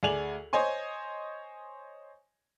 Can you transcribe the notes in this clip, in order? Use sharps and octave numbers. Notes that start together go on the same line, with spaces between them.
D2 G#4 D5 G#5 F7 F#7
C5 C#5 D#5 G#5 C6